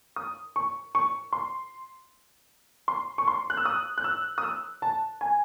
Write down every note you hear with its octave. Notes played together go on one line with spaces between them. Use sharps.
D#6
C#6
C#6
C6
C6
C#6
C6
F#6
E6
D#6
F#6
E6
D#6
E6
A5
G#5